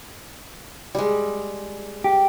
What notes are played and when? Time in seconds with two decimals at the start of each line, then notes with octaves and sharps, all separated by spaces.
0.95 G3 G#3
2.04 G4